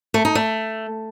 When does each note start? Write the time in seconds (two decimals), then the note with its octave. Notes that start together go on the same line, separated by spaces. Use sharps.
0.14 A3
0.25 D#4
0.35 A3